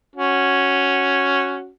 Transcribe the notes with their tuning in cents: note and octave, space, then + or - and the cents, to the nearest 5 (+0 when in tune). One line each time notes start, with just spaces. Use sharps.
C#4 +0 F#4 +0